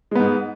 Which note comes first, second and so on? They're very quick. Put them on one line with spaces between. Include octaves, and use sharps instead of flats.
G#3 B3 G#2